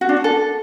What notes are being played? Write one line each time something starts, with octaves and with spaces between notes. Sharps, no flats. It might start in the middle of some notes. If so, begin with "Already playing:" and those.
F#4
D4
F#4
A4